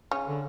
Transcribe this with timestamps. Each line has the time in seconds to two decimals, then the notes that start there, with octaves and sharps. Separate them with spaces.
0.11 C#3 C#4
0.27 D3